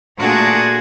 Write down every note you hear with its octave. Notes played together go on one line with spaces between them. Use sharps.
A#2 A3 D4 F#4 G#4